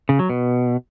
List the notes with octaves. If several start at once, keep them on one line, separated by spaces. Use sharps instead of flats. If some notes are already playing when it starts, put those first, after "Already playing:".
C#3
F#3
B2